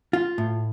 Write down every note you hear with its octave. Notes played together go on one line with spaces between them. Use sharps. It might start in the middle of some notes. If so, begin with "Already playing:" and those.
F4
A2